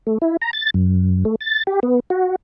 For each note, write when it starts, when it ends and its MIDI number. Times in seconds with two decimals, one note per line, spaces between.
0.07 0.18 57
0.22 0.37 64
0.42 0.51 82
0.53 0.70 93
0.74 1.24 42
1.25 1.35 57
1.41 1.63 93
1.67 1.80 67
1.83 2.00 59
2.10 2.35 66